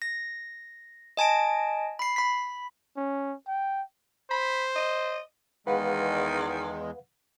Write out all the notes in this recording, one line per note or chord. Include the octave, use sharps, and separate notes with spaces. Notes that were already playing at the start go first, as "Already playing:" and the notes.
A#6
D#5 G#5 A5 D7
B5 C7
B5 B6
C#4
G5
C5 B5
D#5
E2 D#3 G#3 B4 F5 F#5